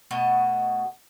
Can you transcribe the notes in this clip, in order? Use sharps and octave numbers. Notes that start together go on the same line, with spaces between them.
B2 A3 D#5 F#5